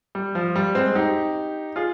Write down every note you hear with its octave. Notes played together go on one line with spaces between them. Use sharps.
G3
F3
G3
G#3 C4
D#4 G4
F4 G#4